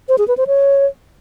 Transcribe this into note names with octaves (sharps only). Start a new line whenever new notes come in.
C5
G#4
B4
C5
C#5